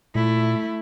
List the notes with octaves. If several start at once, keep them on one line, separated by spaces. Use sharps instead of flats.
A#2 A3 E4